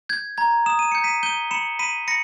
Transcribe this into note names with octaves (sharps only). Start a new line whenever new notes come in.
G6 G#6
A#5 G#6
D#6 E7
D#7
G6 C#7
B6 D#7
G6 D#7 G7
B5 C#7 E7
B5 B6 D#7
B5 A#6 C#7